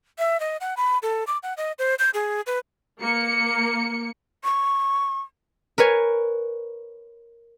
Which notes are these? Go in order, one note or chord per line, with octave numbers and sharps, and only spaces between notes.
E5
D#5
F#5
B5
A4
D6
F#5
D#5
C5
G6
G#4
B4
A#3 C#7
C#6
A#4 B4 C#5 G#5